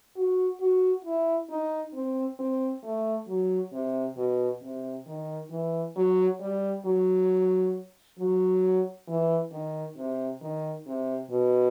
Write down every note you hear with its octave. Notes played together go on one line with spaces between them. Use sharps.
F#4
F#4
E4
D#4
C4
C4
A3
F#3
C3
B2
C3
D#3
E3
F#3
G3
F#3
F#3
E3
D#3
C3
D#3
C3
B2